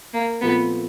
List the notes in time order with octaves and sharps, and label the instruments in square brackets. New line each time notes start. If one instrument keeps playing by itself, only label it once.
[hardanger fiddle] A#3
[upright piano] A#2 F3 A3 C4 [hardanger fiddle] B3